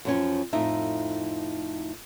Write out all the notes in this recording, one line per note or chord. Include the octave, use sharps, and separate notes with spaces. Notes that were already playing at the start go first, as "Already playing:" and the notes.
F#2 F3 C#4
F2 A2 D#4 E5